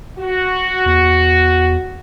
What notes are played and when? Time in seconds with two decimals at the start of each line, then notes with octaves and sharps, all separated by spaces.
0.19 F#4
0.86 E2